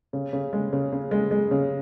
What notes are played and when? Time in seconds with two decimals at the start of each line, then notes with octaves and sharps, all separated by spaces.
0.13 C#3
0.33 C#3
0.53 G#3
0.73 C#3
0.92 C#3
1.11 G#3
1.31 G#3
1.51 C#3